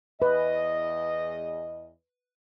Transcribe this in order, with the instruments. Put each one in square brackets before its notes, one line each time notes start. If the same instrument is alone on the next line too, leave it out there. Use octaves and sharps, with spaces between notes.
[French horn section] E2 D#5 [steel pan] B4